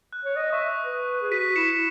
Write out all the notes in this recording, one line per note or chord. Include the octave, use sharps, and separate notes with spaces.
F#6
C#5
D#5 D#6
E5 C#6
D#6
B4
G#4
F#4 B6 D#7
E4 C#7 E7